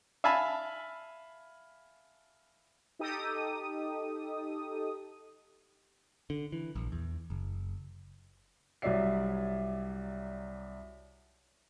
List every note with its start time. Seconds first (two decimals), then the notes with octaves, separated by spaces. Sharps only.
0.24 E5 F5 G#5 A5 B5
2.99 D#4 G4 A4 D#6
6.30 D3
6.52 E3
6.76 A#1
6.92 E2
7.30 F#1
8.82 C2 F#3 C#5 D5 E5 C7